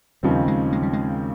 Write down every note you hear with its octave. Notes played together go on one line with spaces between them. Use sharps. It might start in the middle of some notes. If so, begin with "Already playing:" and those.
D#2 C#3 F3 G3 C4 D#4
G#3
G#3
G3
G#3